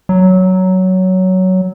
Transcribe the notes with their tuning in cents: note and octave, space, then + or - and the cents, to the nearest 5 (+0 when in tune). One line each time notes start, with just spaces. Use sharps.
F#3 +10